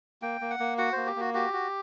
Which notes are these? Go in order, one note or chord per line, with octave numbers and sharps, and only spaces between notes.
A#3 G5
A#3
F#5
A#3
F#4 F#5
A#3 C5
G4
A#3 F#4
F#4 G4
F#4